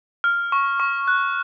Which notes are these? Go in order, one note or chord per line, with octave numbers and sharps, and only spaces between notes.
F6
C#6
C#6
F#6